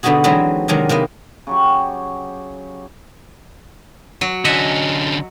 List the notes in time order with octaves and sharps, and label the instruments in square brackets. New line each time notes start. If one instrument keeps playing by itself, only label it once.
[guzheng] B2 D3 B3 D#4 F#4 G#4
E3 F#3 G#3 C4 D#4 B4
C3 D#3 F#3 G#3 D4 D#4
C3 A#3 B3 D#5
[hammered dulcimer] C#3 F#3 G4
[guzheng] F#3
[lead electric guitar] D3 C#4 [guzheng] D#5 E5 F#5